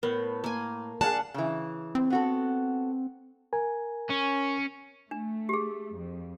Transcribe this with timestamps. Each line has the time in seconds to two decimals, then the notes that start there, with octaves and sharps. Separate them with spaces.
0.03 A2 B3 A#4
0.44 A#3 G#5
1.01 D4 G#4 F5 F#5 A5
1.34 C#3 E3
1.95 C4
2.10 B3 F#4 A4
3.53 A#4 G#5
4.10 C#4
5.11 A3 D4
5.49 G4 G#4
5.95 F2